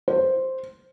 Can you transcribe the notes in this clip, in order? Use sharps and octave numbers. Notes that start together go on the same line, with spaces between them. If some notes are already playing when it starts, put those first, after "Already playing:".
C5